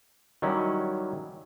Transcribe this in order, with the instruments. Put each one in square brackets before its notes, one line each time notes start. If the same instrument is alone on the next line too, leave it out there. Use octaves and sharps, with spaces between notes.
[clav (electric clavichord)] D#3 F#3 G3 C#4 E4